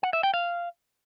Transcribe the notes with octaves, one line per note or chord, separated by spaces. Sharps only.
F#5
E5
G5
F5